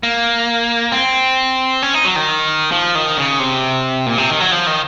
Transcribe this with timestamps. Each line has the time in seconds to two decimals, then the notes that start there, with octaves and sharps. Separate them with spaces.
0.03 A#3
0.92 C4
1.82 C#4
1.94 D#4
2.05 F#3
2.16 D#3
2.72 F3
2.95 D#3
3.17 C#3
3.39 C3
4.06 A#2
4.18 C3
4.29 D#3
4.40 F#3
4.52 F3
4.67 D#3